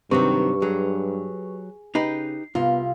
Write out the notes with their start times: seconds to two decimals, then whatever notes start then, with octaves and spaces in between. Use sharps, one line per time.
0.11 G2 C3 D#3 F#3 C4 G4 B4 C#6
0.62 F#3 G#4
1.95 C#3 D#4 G4 B4 C7
2.55 C2 B3 F4 F5